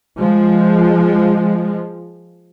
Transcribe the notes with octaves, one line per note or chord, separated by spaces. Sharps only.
F3 G#3